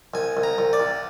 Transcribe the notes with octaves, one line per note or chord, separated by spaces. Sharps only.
C2 G#5
C2
A#5
C2
D5
C2